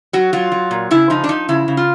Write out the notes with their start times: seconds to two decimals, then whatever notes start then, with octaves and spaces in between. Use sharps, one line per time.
0.13 F#3 F#4
0.33 F#3 F4
0.52 F#3
0.71 A#2
0.91 C#3 E4
1.10 F3 D#4
1.24 D4
1.29 F3 D#4
1.48 C#3 E4
1.68 C#3
1.77 F4